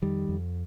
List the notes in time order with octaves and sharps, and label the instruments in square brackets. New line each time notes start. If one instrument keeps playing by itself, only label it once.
[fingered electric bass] F2 D#3 G3
F2